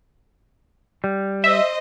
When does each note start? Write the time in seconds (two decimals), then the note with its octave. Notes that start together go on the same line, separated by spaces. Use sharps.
1.04 G3
1.44 C5 D#5 E5